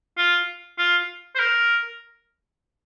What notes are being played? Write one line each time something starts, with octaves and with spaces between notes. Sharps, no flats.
F4
F4
C5
A#4